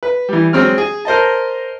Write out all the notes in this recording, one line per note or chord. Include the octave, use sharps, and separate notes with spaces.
B4
E3 G3
F#3 G#3 C4 F6
G#4
A#4 C5 D#5 A5